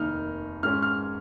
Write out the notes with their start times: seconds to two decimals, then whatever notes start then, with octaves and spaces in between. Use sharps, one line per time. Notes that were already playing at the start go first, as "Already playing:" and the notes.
Already playing: F1 D#2 D#3 A#3 D#4 F6
0.63 G#2 G#3 C#4 F6
0.82 F6